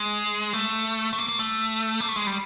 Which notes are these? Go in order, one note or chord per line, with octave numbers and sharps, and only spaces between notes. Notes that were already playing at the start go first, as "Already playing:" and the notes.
Already playing: G#3
A3
A3
A#3
A#3
A3
A#3
A3
G#3
G3